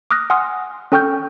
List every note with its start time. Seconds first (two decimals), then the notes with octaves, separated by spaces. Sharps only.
0.11 D6 D#6 F6 F#6 A#6
0.30 F#5 G#5 C6 D#6 F6
0.92 C#4 A4 G5 C#6 F6 G6